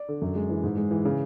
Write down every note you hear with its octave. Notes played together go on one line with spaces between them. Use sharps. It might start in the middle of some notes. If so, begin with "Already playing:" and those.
Already playing: D5
D3
F#2
G#3
E3
G#2
G#3
E3
C#3